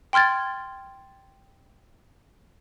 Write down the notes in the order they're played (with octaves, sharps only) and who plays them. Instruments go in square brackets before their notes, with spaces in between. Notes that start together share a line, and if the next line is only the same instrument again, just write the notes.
[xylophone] G5 C6 F6 G#6 A6